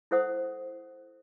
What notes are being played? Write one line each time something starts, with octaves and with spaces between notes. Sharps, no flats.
E4 A4 C5 F#5 D#6